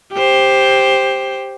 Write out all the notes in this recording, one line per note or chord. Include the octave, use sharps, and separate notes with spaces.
G4 C5